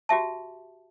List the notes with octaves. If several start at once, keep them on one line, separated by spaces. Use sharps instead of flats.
F#4 G4 E5 A5